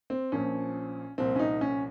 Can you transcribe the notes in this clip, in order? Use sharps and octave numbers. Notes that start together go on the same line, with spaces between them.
C4
A#1 A#2 F3 C#4
C2 A#2 F3 C4
C#4
D#4
C#4